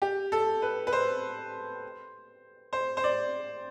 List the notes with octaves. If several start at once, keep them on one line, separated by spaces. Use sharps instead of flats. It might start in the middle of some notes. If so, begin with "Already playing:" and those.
G4
A4
B4
B4
C5
C5
C5
D5